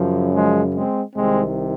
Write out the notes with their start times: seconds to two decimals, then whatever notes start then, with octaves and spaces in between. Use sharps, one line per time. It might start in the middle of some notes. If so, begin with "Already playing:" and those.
Already playing: F#2 C#3 F3
0.35 F3 G#3
0.75 G#3 C4
1.15 C2 C3 D#3 G#3 C4